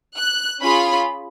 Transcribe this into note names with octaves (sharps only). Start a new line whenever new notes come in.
F#6
C#4 F4 G#4 B5